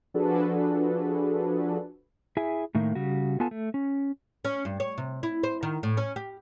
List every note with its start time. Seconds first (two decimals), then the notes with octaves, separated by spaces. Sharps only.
0.14 F3 D4 F#4 G#4 A4 B4
2.37 E4 G#4 E5 G#5
2.75 A2 D#3 A3 A#3
2.95 C#3 G3 F#4
3.40 B3 F4 A4 G#5 A5
3.51 A3
3.74 C#4
4.45 C#4
4.65 G2
4.80 C#5
4.98 C3
5.23 E4
5.43 C5
5.63 D#3
5.83 A2
5.97 C#4
6.16 G4